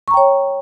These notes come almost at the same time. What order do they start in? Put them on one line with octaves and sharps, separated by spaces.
C#6 A#5 G5 C#5